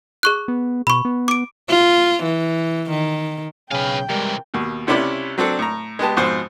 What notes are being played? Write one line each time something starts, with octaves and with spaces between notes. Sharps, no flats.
G#4 C#6 F#6
B3
B2 B5 C#6
B3
D6 D7
F4
E3
D#3
B1 C#3 B4 F5 G5 G#5
C3 E3 G3 G#3 A#4
D#2 B2
C#2 C3 C#4 E4 D5 B5
F#3 C4 D4 A4
A2 A#5
G#3 B3 G4 A5
F2 G#2 B2 C5